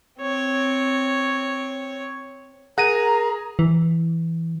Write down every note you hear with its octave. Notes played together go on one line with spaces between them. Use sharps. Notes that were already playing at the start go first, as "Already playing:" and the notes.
C4 C#5
G#4 A#4 F#5 A#5 A#6 D#7
E3